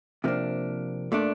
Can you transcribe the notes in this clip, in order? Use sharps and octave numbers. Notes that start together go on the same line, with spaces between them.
C3 F3 A#3 D4
A#2 A3 D4